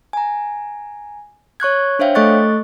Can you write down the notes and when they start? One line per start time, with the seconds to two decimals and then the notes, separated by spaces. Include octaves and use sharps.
0.13 G#5 A#5
1.60 C#5 C#6 F#6 G#6
1.99 D4 C5 C#5 E5 F5 G5
2.15 A3 A4 D#5 C#6 F#6 A6